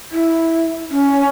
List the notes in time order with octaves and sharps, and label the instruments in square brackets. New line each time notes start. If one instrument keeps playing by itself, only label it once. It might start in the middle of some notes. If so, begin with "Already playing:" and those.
[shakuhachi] E4
C#4